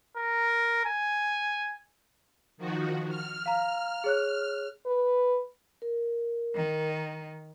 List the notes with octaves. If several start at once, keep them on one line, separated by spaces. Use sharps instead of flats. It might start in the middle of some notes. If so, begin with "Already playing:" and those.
A#4
G#5
D#3 F3 F#4
F6
F5 A#5
G#4 C#5 F#6
B4
A#4
D#3